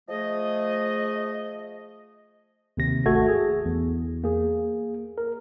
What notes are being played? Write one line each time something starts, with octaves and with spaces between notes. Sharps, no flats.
F3 A3 G#4 D#5
D#2 C3 A#6
G#1 A3 F#4 A4 G#6
G#4
E2
A#3 G#4
A#4